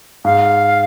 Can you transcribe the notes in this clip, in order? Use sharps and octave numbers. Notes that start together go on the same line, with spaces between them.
G#2 F5